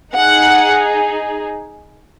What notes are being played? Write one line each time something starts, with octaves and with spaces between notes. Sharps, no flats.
D#4 G#4 F#5